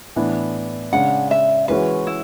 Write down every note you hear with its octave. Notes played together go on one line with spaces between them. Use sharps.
A2 E3 B3 D4
C#3 G#3 D4 F#5
E5
E3 G#3 C#4 F#4 B4
E4